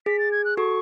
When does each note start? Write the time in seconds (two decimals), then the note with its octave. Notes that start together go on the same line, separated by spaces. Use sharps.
0.06 G#4 B6
0.19 A6
0.32 G#6
0.45 F#6
0.57 F#4 A4 C#6